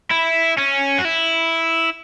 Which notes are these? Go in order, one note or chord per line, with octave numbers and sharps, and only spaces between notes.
E4
C#4
F#4
E4